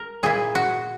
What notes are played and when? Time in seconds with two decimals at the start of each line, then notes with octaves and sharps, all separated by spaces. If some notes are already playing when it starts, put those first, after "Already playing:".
Already playing: A#4
0.23 A#2 A#3 E4 G#4
0.55 F#4